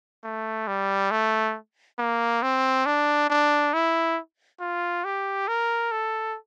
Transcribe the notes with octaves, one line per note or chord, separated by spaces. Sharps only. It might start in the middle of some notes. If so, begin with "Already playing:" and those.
A3
G3
A3
A#3
C4
D4
D4
E4
F4
G4
A#4
A4